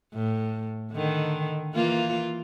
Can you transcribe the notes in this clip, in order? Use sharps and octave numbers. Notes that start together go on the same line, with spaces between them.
A2
D3 D#3
E3 A#3 F4